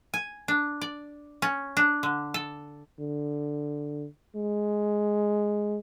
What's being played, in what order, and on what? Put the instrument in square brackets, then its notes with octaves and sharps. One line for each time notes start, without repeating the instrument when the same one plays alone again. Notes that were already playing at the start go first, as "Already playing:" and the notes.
[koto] G#5
D4
D5
C#4
D4
D3
A4
[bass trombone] D3
G#3